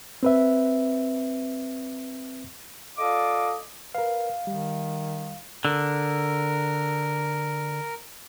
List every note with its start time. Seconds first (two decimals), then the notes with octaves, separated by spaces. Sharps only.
0.23 C4 B4 E5
2.96 F4 A4 D5 D#5 F5 D6
3.95 A#4 B4 F5
4.47 D#3 G3
5.65 D3 A#4